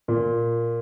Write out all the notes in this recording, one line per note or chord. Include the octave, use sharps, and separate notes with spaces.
A#2